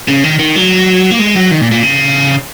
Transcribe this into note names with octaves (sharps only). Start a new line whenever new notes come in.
C#3
D#3
D#3
F#3
A#3
G#3
F#3
D#3
A#2
A#2
C#3